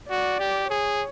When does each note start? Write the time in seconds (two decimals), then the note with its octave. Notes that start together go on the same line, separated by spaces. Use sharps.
0.10 F#4 D5
0.40 G4
0.70 G#4 C#5